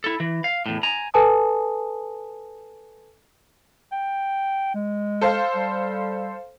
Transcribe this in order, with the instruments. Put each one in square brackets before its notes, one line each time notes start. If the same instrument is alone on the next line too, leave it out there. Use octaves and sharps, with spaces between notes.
[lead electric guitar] E4 A4
E3
F5
E2 A2
G#5 A#5
[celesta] A4 B4 G#5 A5 D#6
[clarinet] G5
G#3
[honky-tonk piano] A4 C5 F5
[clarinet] G3